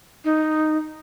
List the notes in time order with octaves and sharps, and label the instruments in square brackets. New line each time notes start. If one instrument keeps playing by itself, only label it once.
[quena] D#4